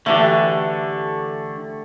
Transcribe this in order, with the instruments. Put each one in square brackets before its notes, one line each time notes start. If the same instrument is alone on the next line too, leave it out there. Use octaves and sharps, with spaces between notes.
[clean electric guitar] D3 E3 [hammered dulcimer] A3 G4